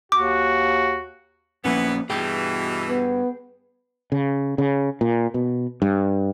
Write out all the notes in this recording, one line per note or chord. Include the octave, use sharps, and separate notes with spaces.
D#2 F#4 D6
A#1 F2 E3 A#3 B3 C#4
G2 B2 E3 G#4 G5
B3
C#3
C#3
A#2
B2
G2